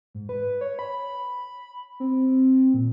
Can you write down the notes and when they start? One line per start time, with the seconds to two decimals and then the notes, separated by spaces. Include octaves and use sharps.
0.15 G#2
0.29 B4
0.61 C#5
0.79 B5
2.00 C4
2.74 A#2